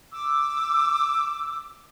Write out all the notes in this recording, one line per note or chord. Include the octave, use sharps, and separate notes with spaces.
D6 E6